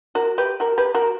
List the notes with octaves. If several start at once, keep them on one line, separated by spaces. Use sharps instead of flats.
F#4 A#4
G4 B4
F#4 A#4
G4 B4
F#4 A#4